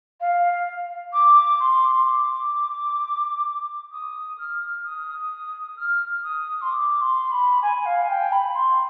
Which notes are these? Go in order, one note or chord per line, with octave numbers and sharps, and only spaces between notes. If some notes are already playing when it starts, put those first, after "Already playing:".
F5
D6
C6
D6
D#6
F6
D#6
F6
D#6
C6
D6
C6
B5
G#5
F5
G#5
G5
B5
C6